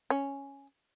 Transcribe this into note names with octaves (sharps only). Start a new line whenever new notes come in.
C#4